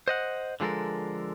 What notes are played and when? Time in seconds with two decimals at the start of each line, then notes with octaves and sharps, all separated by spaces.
0.08 C5 D#5 F#5
0.60 D3 F3 G#3 A4 A#4